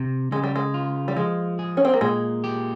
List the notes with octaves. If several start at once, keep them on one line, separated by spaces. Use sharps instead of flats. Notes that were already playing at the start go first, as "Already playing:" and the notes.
Already playing: C3
C#3 G#3
G3
G#3
F4
G3
F3 G#3
G#4
C#4
C4
A#3
A#2 G#3
G4